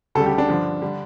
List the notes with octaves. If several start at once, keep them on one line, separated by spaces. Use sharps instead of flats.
D2 C#3 G3 A4
G4
D4
G2 D3 F3
D3 G3